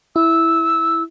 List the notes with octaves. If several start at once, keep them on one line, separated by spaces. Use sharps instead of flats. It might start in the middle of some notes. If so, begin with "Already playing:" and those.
E4 E6